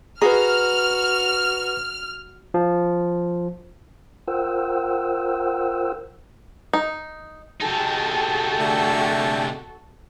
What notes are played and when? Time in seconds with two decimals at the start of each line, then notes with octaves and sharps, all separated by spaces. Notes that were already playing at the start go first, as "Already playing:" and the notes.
0.22 F#4 G#4 B4 D#5 A#5 F6
2.54 F3
4.28 F4 A#4 C5 F#5 G5 E6
6.73 D#4
7.61 C3 D#4 F#4 G#4 A4 G5 A5
8.58 D3 A3